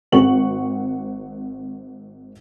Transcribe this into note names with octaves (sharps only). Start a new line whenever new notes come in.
G#1 C4 F#4 F#5 C#6 F#7